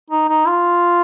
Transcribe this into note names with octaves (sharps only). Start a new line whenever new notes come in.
D#4
D#4
F4